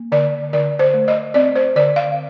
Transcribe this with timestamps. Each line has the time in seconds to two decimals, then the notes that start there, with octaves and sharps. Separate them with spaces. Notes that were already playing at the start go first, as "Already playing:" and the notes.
Already playing: A#3
0.12 D3 D5
0.53 D3 D5
0.79 C5
0.94 A3
1.08 D#5
1.34 C4 D5
1.56 C5
1.76 D3 D5
1.96 F5